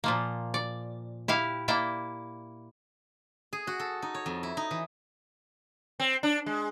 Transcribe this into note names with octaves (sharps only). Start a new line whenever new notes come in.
A#2 F3 A#3
D5
E4 G4 F5
A#3 E4 D5 G5
G#4
F#4
A4
D#4
C#5
F2
E4
D#4
E3
C4
D4
G#3